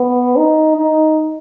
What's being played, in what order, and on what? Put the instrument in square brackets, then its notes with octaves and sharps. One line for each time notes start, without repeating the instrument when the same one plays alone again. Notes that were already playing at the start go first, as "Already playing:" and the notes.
Already playing: [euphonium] B3
D#4
D#4